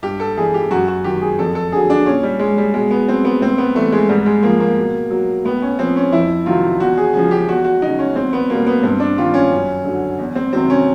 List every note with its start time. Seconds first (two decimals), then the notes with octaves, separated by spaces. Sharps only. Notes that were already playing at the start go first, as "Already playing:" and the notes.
0.03 G2 G4
0.20 A4
0.37 E3 G3 G#4
0.54 G4
0.70 F#2 F#4
0.88 F#4
1.04 D#3 F#3 G4
1.22 G#4
1.39 F2 A4
1.55 A4
1.72 D3 F#3 G#4
1.90 D4
2.06 A#2 C#4
2.23 G3
2.39 G3 G#3
2.58 G3
2.74 B2 G#3
2.91 B3
3.08 F#3 C4
3.25 B3
3.41 A2 C4
3.58 B3
3.75 E3 G3 A3
3.92 G#3
4.09 G#2 G3
4.26 G#3
4.43 F3 A#3
4.60 A#3
4.77 B2
5.11 F#3
5.45 A2 B3
5.62 C#4
5.78 F3 C4
5.96 C#4
6.12 F2 E4
6.46 C3 D#3 F#3 F4
6.80 E2 F#4
6.98 G#4
7.14 C#3 F3 G#4
7.31 G4
7.49 E2 F#4
7.64 F#4
7.82 C#3 F#3 D#4
7.99 C#4
8.16 E2 C4
8.33 B3
8.50 B2 G3 A#3
8.66 B3
8.83 G2 C4
9.00 D4
9.17 D#3 G3 F4
9.34 C#4
9.51 F#2
9.84 D3 F#3
10.18 E2
10.35 C4
10.53 C3 D#3 F#3 C4
10.70 C#4